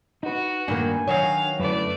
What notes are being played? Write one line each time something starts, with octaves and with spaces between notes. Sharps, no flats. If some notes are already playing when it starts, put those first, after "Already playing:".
D#4 F#4 B4
G2 D#3 A#3 D4 B4 G#5
D#3 F#3 C#5 F5
F#2 D3 A3 E4 B4 D5